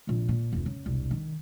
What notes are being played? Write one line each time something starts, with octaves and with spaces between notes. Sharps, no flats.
F1 A#1
A#2
F1 D2
C#3
E1 C2
D#3